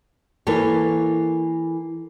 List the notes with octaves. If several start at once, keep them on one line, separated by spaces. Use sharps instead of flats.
E3 A#3 A4 A#4 C#5